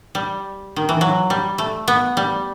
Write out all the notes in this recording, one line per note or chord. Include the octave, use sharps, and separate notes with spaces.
G3
D#3
E3
F#3
G3
A3
B3
G3